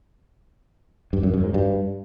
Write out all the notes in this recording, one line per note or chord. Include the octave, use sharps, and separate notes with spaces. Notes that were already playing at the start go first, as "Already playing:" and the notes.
G2
F#2
F#2
G#2
G2